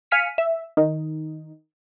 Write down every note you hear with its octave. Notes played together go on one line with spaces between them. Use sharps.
F5 G#5 F6 B6 C#7 D#7
E5
D#3 D#4